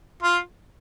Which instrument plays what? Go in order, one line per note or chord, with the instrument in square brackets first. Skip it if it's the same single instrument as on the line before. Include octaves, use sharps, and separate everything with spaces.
[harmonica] F4